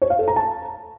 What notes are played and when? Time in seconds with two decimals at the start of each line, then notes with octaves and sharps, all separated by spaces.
0.02 C#5
0.10 F5
0.19 A4
0.28 A#5
0.36 A5